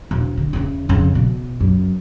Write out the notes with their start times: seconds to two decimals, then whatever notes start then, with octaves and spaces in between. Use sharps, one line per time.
0.11 E1
0.37 D3
0.53 E2 C#3
0.89 F2 C#3
1.15 B2
1.60 F#2